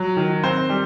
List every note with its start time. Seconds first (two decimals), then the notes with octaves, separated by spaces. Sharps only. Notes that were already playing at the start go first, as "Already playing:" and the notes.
Already playing: F#3
0.17 D#3
0.44 C4 C5
0.70 G3